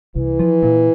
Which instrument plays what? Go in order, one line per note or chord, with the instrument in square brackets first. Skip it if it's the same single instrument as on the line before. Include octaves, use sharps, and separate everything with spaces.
[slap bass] C2 [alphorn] E3
[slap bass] F3
A#2